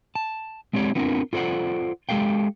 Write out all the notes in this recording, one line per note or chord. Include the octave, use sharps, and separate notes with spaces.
A5
G#3 C4 G4 C#5 D5
B3 C4 D4 F4 A#4
F4 A4 C5 D5 F#5
G#3 G4 A4 F5 G5